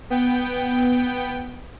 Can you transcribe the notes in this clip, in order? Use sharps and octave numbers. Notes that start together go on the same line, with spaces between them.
B3 G5